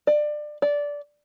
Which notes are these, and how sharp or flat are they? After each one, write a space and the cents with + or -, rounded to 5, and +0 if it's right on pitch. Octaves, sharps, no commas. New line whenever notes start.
D5 +25
D5 -15